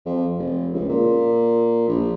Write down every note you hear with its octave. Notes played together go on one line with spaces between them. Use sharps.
F2
F1
C#2
A#2
A#1